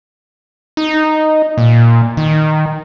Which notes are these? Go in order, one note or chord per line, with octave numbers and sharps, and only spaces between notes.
D#4
A#2
D#3